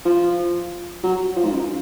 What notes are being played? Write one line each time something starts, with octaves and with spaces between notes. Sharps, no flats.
F3
F#3
F3
G#2
F#2